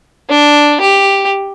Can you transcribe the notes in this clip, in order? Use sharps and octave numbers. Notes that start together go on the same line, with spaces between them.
D4
G4